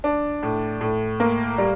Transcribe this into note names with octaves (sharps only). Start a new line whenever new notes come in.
D4
A2
A2
A#3
G3